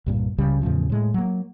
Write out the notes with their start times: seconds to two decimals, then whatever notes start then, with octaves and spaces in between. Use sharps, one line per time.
0.06 C2 G2 A#2
0.38 C#2 C#3 G3
0.62 E2 A2 C#3 F3
0.90 A2 G#3
1.14 F#3 A#3